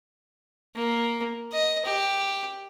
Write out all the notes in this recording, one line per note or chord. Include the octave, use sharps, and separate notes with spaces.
A#3
D#5
G4